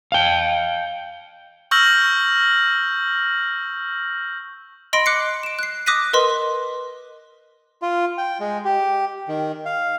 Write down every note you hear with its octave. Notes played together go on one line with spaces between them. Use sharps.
F5 G5
C#6 E6 F6 G6 A#6 F#7
D#5 B5 C6 A#6 D7 F#7
D6 F#6 C7 C#7
D7 E7
F#6 C7
D6 D#6 F#6 A#6 B6 D#7
A#4 B4 D#5 C6
F4
G5
G#3
G4
D#3
F5